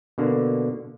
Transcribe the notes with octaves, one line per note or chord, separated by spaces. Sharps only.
B2 D3 A#3